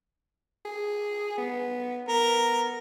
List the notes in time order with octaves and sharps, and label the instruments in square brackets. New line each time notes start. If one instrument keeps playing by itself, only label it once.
[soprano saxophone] G#4
B3
[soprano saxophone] B3 [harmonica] A#4